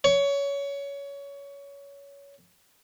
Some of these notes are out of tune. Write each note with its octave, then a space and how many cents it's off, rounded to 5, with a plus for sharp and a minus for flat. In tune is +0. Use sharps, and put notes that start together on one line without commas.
C#5 +20